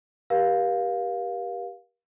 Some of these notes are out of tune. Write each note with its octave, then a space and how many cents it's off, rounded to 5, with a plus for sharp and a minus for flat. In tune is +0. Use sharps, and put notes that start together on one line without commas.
G4 +0 A#4 +40 F5 +10